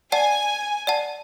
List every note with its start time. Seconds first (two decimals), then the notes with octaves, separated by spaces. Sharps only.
0.12 D5 F#5 G#5 A5
0.87 D5 F#5 A5